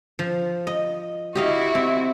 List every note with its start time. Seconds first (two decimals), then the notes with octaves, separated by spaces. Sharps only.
0.19 F3
0.67 D#5
1.35 E4 F#4 G4 D#5 F5
1.75 C4